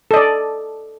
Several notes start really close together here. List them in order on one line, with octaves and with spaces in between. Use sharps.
A4 D#5 D5